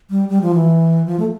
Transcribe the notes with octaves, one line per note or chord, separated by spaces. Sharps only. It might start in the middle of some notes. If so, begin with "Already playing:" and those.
G3
G3
F3
E3
F3
A3